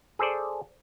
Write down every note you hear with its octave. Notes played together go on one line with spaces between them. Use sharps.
G#4 A4 C5 D5